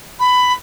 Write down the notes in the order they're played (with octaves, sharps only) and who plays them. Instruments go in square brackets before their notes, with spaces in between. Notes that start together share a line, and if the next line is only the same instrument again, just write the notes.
[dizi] B5